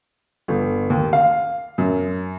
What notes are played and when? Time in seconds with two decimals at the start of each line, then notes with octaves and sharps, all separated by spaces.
0.48 G1
0.90 D#2
1.13 F5
1.78 F#2